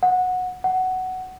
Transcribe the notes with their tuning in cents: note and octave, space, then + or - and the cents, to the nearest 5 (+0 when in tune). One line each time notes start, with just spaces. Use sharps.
F#5 -15
F#5 +10